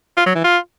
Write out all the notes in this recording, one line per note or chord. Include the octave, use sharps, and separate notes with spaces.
F4
F#3
E3
F4